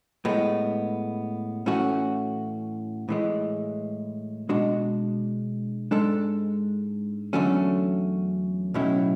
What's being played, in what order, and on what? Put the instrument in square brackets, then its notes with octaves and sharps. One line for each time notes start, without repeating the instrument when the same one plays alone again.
[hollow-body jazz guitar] A2 G#3 B3
A2 E3 A3 C#4 F#4
A2 E3 G#3
B2 G#3 D4 F#4
G#2 G#3 D4 A4
E2 D3 F#3 A3 C#4
B1 A2 F#3 C#4 E4